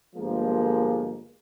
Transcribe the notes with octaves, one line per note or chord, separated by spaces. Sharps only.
G1 F3 G#3 A#3